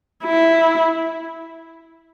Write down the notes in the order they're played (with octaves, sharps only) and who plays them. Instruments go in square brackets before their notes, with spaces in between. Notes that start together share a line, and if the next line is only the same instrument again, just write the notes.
[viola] E4